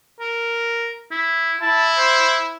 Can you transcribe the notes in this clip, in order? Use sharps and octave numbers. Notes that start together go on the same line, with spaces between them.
A#4
E4
E4 A5
C5